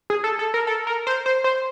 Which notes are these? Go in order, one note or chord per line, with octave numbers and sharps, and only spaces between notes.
G#4
A4
A4
A#4
A4
A#4
C5
C5
C5